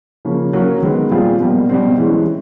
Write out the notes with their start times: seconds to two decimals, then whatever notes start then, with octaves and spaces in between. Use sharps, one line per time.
0.25 C#3 F3 A#3 C#4
0.53 F#3 A#3 C#4 F#4 A#4
0.82 D#3 G#3 B3
1.11 A#2 G3 C4 F4 G#4
1.40 B2 G3 A#3
1.69 B2 G3 C4
1.98 E3 G#3 C#4